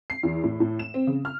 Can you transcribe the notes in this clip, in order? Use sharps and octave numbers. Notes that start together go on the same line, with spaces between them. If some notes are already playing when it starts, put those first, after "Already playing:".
C7
E2
A2
A2
E7
C4
C#3
F6